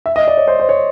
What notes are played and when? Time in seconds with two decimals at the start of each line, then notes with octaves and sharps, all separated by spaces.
0.06 E5
0.16 D#5
0.28 D5
0.37 C#5
0.47 C5
0.60 C5
0.69 C#5